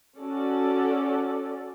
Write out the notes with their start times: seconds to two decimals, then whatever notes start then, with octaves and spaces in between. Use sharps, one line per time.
0.17 C#4 F#4 A4 D5